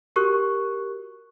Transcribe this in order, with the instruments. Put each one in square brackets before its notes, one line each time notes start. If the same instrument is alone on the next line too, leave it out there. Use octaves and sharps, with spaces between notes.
[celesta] F#4 G4 A#4 C#6 F#6